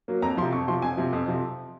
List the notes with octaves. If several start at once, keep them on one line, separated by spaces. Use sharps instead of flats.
F#3 A#3
F2 A#5
C3 F3 C6
F2 C#6
C3 F3 C6
F2 G#5
C3 F3
F2
C3 F3